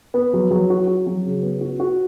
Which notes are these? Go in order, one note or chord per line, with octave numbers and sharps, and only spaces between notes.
B3
F#3
F#3
F#4
F#4
F#3
C#3
B3
F#4
F#4